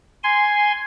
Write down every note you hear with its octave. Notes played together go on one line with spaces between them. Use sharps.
G#5 C6